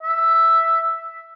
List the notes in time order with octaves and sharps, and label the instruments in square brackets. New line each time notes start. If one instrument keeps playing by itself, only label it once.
[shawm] E5